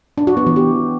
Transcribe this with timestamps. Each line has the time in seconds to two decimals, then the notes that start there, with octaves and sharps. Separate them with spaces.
0.18 D4
0.27 F#4
0.37 B3
0.46 E3
0.56 G4